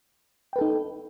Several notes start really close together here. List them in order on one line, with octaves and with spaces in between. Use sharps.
G5 B4 A4 D#4